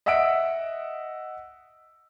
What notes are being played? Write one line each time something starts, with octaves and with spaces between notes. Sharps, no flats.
D#5 E5 F#5 E6 B6 D7